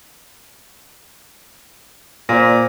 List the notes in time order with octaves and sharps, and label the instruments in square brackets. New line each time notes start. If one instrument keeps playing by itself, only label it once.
[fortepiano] A#2 [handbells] C5 D5 A#6